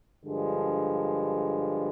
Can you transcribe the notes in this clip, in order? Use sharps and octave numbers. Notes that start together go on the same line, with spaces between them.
G2 D3 F3 G#3